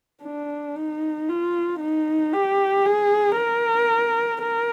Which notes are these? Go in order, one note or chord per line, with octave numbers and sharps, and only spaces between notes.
D4
D#4
F4
D#4
G4
G#4
A#4
A#4